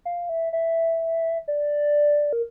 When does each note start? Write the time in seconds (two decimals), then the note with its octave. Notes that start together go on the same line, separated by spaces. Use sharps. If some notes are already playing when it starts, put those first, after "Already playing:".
0.05 F5
0.29 E5
0.53 E5
1.48 D5
2.33 A#4